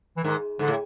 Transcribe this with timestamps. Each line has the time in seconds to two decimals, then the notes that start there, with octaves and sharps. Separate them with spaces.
0.17 E3
0.24 G#2 D#3
0.59 G#2 D3
0.68 A2